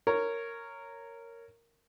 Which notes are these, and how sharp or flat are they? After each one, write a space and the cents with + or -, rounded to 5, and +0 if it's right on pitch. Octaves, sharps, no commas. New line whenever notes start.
A#4 -10 C#5 +0